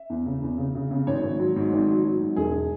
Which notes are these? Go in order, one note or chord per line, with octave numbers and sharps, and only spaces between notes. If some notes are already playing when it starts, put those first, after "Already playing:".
Already playing: E5
E2
C#3
E2
C#3
C#3
C#3
G#1 C#5
G#1
F#3
G#2
G#1
F#3
F#3
G#2
E1 G#4